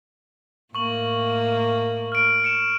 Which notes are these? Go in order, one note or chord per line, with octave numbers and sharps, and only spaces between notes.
A2 A#3 C#6 F#7
F6 D7
C#7 E7